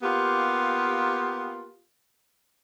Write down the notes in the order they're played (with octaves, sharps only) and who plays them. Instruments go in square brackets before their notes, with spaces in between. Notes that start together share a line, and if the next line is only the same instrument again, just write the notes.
[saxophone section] A#3 B3 F4 G4